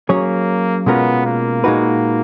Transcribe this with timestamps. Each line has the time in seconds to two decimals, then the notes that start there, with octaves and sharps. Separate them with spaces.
0.09 F#3 A#3 C#4 G#4 C#5
0.86 B2 G#3 B3 C#4 F4 A#4
1.26 A#3
1.64 A#2 G#3 D#4 F#4 B4